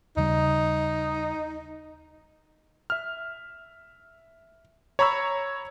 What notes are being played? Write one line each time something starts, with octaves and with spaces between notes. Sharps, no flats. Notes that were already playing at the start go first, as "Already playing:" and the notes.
D#2 C#3 G3 D#4
E5 F6
C#5 A#5 B5 C#6 E6 G#6